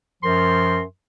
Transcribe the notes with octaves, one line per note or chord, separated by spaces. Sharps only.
F#2 F3 A#4 C6